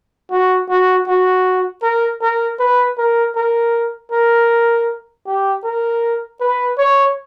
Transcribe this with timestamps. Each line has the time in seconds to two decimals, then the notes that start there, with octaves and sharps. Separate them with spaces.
0.31 F#4
0.69 F#4
1.07 F#4
1.83 A#4
2.22 A#4
2.59 B4
2.98 A#4
3.36 A#4
4.12 A#4
5.26 G4
5.64 A#4
6.41 B4
6.78 C#5